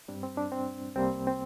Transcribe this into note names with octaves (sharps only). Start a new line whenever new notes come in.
G2 G3 C4 D4
C4
D4
C4
C2 C3 G3 A#3 C4
C4